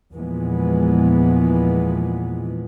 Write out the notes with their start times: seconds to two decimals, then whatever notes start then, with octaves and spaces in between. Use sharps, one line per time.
0.15 E2 A#2 E3 F3 G#3 B3